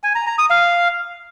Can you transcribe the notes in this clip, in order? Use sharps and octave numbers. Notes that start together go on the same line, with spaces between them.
G#5
A#5
A#5
D#6
F5